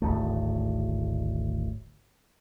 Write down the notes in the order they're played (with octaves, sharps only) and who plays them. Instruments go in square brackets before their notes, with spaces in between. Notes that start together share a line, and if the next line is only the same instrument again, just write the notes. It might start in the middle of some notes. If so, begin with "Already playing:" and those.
[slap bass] D1 G#1 A3